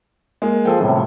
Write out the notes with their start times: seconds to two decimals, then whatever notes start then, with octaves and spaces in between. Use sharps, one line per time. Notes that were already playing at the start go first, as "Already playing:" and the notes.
0.42 G#3 A#3
0.65 F3 G#4 A4 G5
0.80 D#1 A2 C3